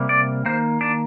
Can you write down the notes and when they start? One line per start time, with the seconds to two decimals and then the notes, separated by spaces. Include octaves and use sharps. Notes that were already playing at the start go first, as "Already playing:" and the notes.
Already playing: C3 G3 A#3
0.09 D5
0.46 D#3 A#3 C5
0.81 D4